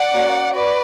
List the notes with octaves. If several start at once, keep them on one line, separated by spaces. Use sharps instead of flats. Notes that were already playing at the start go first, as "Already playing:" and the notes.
Already playing: D5 F#5
A#3 C#4 F#4
F#4 B4 D5